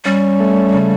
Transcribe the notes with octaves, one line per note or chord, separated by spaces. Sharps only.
G3 C#4
A3
C#3